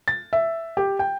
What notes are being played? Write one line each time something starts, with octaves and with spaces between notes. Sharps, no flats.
A6
E5
G4
G5